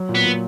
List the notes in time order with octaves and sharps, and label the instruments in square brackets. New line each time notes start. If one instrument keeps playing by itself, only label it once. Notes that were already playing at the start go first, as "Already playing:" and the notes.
Already playing: [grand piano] F#3
A#2
[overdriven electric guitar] B3
[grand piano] A#2